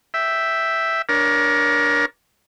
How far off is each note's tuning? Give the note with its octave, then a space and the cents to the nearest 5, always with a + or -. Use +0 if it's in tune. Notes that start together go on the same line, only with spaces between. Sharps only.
E5 +0 G5 +0
D4 +0 A#4 +25 C#5 +10